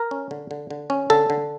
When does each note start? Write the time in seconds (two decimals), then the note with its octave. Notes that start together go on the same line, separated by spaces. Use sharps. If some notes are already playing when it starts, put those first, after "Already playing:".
Already playing: A#4
0.11 C#4
0.31 D3
0.51 D3
0.70 D3
0.90 C#4
1.10 D3 A4
1.30 D3